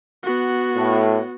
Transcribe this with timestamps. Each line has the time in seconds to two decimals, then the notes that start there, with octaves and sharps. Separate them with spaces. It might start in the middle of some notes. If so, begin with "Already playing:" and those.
0.23 B3 F#4
0.77 A2